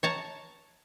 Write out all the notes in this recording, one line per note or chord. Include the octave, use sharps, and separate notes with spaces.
C#5 A5 A#5